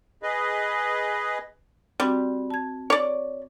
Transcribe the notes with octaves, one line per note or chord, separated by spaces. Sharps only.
G#4 B4 D#5
G3 C4 F#4
A5 G#6
C#5 D5